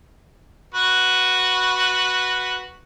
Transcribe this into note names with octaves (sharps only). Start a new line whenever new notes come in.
F#4 B4